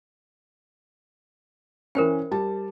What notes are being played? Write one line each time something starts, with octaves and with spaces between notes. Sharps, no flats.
E3 C#4 A#4 C5 G5
G3 A5